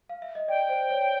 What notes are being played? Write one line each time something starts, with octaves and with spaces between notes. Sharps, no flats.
F5
E5
D#5
D5 G5
C5
C#5